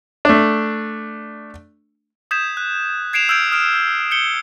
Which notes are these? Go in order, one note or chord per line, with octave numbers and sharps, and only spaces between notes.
A3 D4
D#6 G6 G#6 B6 E7
F#6
G#6 C7 D7 E7 F7
E6 F6 G6 G#6 D7
D#6 F6 D7
G6 C#7 G7